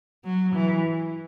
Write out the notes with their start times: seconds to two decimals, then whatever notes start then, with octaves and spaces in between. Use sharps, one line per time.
0.24 F#3
0.55 E3